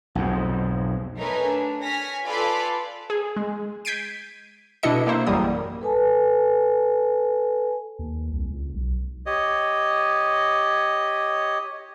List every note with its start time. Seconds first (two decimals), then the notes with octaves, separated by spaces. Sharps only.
0.15 B1 F2 G#2
1.17 A3 D#4 A#4 B4 C#5 G#5
1.46 D4
1.83 C#5 G#5 F6 A#6 B6
2.26 F4 A4 B4 D5 G#5 B5
3.10 G#4
3.36 G#3
3.85 G6 G#6 B6 C7 D7 D#7
4.83 B2 D4 E4 A4 D#5 C#7
5.07 A#3 E4 C5
5.26 A1 F#2 F#3 G3 A#3 D#6
5.81 A4 B4 G#5 A5
7.99 D#2
8.32 C2
8.50 C#2
8.74 B1
9.26 G4 C#5 D#5